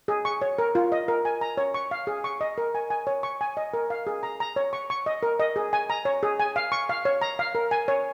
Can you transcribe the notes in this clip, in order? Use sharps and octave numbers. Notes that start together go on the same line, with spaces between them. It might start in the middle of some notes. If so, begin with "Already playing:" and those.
G#4
C#6
C#5
A#4
F4
D#5
A#4
G#5
A#5
C#5
C#6
F5
G#4
C#6
D#5
A#4
G#5
G#5
C#5
C#6
G#5
D#5
A#4
F5
G#4
A#5
A#5
C#5
C#6
C#6
D#5
A#4
D#5
G#4
G#5
A#5
C#5
G#4
G#5
F5
C#6
F5
C#5
A#5
F5
A#4
G#5
C#5